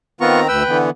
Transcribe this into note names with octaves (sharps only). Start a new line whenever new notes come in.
D#3 B3 C4 F4 A#5 C#6
D2 B4 G5 E6
D3 E3 B3